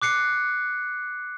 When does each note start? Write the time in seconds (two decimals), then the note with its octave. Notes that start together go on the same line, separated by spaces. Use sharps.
0.02 D6 F#6 C7 C#7